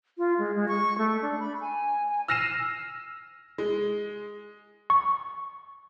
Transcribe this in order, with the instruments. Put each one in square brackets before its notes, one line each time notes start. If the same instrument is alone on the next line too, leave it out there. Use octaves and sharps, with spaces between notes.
[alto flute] F4
G#3
G#3
C#6
A3
D4
B5
G#5
G#5
[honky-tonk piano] E6 F6 A#6 C7 D#7 E7
G#3
[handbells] C#6